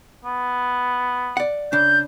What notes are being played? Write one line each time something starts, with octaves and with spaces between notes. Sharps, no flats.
B3
D5 F#5
C#3 D4 G6